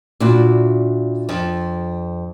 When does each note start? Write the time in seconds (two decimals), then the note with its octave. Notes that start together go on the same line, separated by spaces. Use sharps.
0.20 A#2 D4 E4 F#4
1.29 F2